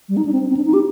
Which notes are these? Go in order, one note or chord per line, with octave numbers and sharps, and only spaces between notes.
G3
D#4
D4
C4
C4
D4
D#4
G4